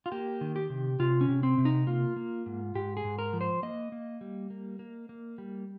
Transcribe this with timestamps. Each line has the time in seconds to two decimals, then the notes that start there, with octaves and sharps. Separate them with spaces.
0.06 F4
0.12 A#3 G4
0.41 D#3
0.56 G4
0.70 C3
0.99 C3 F4
1.21 C#4
1.29 C3
1.43 C4
1.58 C3
1.65 D#4
1.87 A#3 F4
2.16 A#3
2.46 G#2
2.75 G#2 G4
2.97 G#4
3.04 G#2
3.19 A#4
3.33 F3
3.41 C5
3.63 A#3 D#5
3.92 A#3
4.21 G3
4.50 A#3
4.79 A#3
5.09 A#3
5.38 G3